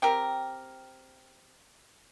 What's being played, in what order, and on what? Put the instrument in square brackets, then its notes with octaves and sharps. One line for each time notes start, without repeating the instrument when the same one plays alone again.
[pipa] C4 G4 A#4